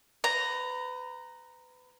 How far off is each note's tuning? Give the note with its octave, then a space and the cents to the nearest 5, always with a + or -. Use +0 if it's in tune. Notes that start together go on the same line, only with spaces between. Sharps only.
B4 +30 A#5 +0